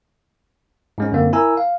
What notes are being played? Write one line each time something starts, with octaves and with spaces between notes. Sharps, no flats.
G#2 G#3 C#4
F#2 D3 A#3 C4
E4 A#4 G#5 A#5 E6
F5